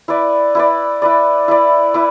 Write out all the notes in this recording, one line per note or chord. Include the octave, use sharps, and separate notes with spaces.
E4 B4 D5
E4 B4 D5
E4 B4 D5
E4 B4 D5
E4 B4 D5